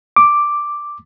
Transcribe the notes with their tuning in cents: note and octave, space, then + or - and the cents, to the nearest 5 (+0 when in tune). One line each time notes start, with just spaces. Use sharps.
D6 +0